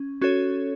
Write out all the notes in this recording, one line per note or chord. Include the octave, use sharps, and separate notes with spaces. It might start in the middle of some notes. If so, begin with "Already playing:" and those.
Already playing: C#4
C#4 F#4 A4 C#5